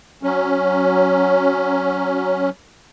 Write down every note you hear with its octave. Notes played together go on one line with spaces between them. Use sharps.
F#3 C#4